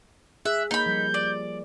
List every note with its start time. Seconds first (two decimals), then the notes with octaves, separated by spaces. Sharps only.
0.45 G#4 E5 F#6
0.71 A#3 D#4 C#5 B5 G6
0.86 F3 G3
1.14 D5